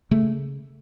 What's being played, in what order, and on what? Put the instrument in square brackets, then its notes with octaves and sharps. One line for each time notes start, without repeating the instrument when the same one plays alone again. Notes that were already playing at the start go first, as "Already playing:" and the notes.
[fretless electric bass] C#3 A3